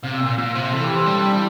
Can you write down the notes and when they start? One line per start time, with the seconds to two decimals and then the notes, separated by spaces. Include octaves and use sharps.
0.03 C3 F5
0.15 E5
0.20 A#2
0.27 E5
0.38 A#2 F5
0.55 C3 C5
0.72 E3 A4
0.84 G4
0.96 C4
1.06 G3 D4
1.19 E4
1.31 D4